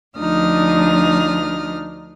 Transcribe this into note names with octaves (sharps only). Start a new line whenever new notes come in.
D2 F3 D4 D#4 D#6 F6